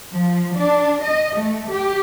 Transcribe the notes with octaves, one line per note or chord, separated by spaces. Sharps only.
F3
D4
D#5
A3
G4